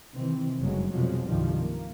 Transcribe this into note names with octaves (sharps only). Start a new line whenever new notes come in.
C3 D#3 E3 C4
F#1 G2 D#3 F#3 G#3
C2 F2 B2 F3 F#3 G#3
C2 G2 D#3 F3 G3
A#3